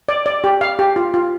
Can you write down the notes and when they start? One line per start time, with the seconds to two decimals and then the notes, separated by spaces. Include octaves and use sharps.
0.09 D5
0.26 D5
0.44 G4
0.61 F5
0.79 G4
0.96 F4
1.14 F4